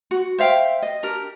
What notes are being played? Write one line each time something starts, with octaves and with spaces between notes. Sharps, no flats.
F#4
C5 E5 F5 G5
D#5
D4 G4 A#4